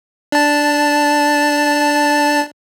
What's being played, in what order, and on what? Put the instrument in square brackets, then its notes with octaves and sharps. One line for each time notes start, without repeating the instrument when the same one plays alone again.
[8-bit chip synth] D4 A5